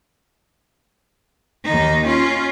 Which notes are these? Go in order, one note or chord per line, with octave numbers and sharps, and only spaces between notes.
D#2 D#4
C#4 F4